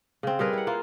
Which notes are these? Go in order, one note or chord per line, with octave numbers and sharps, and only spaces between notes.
C#3 C4
G3 G#4 A#4 B4
E4 F#5
A#3 F4